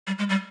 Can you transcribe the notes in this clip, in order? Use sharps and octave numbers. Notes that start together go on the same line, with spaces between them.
G3
G#3
G3